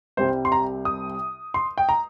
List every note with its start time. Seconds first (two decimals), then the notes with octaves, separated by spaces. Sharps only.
0.17 C2 C3 G3 C4 C5
0.45 C6
0.52 A#5
0.85 D#6
1.54 C6
1.78 G5
1.89 A#5